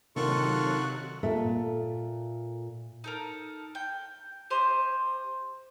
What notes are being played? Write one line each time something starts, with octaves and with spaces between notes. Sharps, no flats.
C3 D#3 F#3 F4 A4 C#6 F#6
A#2 A4 E5
D#4 A4 A#4
G5
G4 C5 D#5 C6